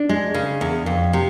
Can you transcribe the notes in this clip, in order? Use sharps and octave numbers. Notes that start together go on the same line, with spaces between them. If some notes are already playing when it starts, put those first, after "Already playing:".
Already playing: D4
G#3
C#3
E2
F2
C3